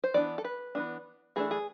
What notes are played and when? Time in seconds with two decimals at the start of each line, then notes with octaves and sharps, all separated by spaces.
0.04 C5
0.14 E3 B3 D4 D5
0.38 A4
0.44 B4
0.75 E3 G#3 B3 D4
1.36 E3 A3 D4 G#4
1.51 G#4